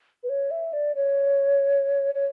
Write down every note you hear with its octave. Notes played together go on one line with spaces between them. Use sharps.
B4
C#5
E5
D5
C#5
C#5